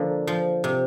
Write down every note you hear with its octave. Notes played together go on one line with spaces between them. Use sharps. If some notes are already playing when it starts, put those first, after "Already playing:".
Already playing: D3 F3 A#3
F3
C3